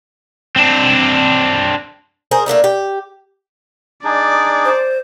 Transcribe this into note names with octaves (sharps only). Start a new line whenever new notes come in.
C4 D4
G#4 A#4 C5
A3 A#3 D4 D#4
G4
D4 D#4 G#4 D5
C5